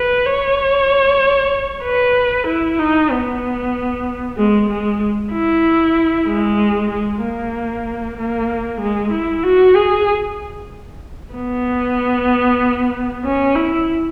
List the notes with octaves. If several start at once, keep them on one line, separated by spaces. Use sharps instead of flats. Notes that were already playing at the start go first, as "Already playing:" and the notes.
Already playing: B4
C#5
B4
E4
D#4
B3
G#3
G#3
E4
G#3
G#3
A#3
A#3
G#3
E4
F#4
G#4
B3
C#4
E4